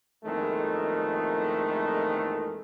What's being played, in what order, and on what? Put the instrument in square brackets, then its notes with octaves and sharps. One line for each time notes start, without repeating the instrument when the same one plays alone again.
[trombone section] A#1 F2 D#3 E3 G#3 A3